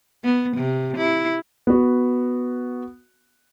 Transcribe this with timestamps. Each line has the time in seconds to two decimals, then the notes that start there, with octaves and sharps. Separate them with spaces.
0.24 B3
0.57 C3
0.98 E4
1.67 B3 F#4